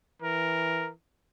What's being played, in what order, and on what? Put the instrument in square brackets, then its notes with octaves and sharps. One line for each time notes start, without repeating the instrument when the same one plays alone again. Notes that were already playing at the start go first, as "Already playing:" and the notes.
[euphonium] E3 [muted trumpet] A#4